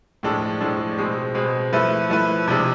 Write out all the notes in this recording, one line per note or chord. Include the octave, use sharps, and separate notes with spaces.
A2 F3 G#3 D4 A4
A2 F3 G#3 D4 A4
B2 G#3 C4
B2 G#3 C4
F3 A3 E4 B4
F3 A3 E4 B4
C3 F3 G#3 D4